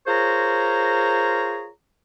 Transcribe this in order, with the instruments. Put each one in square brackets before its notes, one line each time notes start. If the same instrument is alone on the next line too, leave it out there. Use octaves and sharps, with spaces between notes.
[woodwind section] F4 G#4 A#4 C5 C#5 A#5